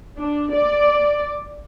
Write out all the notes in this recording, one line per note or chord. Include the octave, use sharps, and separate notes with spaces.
D4
D5